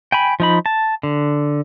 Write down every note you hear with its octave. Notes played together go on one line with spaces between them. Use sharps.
G5 G#5 B5
F3 D#4 B5
A5
D3